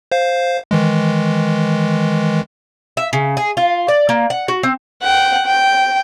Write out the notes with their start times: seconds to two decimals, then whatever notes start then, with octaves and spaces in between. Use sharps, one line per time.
0.12 C5 F5
0.71 D#3 E3 G#3
2.97 E5
3.13 C#3
3.37 G#4
3.57 F4
3.88 D5
4.09 A#3
4.30 F#5
4.48 F#4
4.63 C4
5.02 F#5 G5
5.45 G5